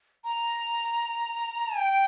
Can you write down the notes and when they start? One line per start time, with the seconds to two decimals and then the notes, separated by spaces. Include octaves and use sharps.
0.24 A#5
1.77 G5